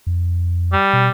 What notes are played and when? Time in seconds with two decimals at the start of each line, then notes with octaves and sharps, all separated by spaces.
0.07 F2
0.73 G3
0.93 B2